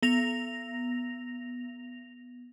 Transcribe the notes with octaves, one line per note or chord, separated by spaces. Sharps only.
B3 A#6 F7